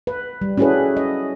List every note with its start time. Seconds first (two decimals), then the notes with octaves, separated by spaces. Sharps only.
0.07 B4
0.41 G3
0.57 C#4 E4 F#4 G#4 A4 B4
0.97 D#5